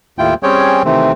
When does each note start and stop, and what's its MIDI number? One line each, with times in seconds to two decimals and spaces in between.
0.19 0.34 39
0.19 0.34 45
0.19 0.34 64
0.19 0.34 65
0.19 0.34 79
0.43 0.82 55
0.43 0.82 60
0.43 0.82 61
0.43 0.82 68
0.43 0.82 73
0.43 0.82 79
0.85 1.12 48
0.85 1.12 51
0.85 1.12 52
0.85 1.12 57
0.85 1.12 60